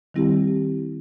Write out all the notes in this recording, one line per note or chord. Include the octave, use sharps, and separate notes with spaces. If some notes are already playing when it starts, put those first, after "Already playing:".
D#3 G3 C4 E4 G4